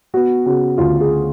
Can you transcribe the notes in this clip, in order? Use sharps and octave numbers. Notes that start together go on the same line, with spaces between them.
B3 F#4
C#3 F#4
D2 F4
G#4